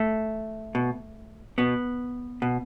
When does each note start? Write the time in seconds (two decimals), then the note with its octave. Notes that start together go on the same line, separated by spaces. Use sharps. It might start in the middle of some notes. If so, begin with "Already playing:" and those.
Already playing: A3
0.75 B2
1.58 B2 B3
2.42 B2